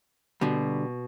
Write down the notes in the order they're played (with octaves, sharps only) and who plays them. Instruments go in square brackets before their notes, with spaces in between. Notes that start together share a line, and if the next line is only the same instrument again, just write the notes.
[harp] B2 [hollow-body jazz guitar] D3 G3